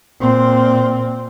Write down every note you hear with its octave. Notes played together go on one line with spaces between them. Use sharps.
A#2 C4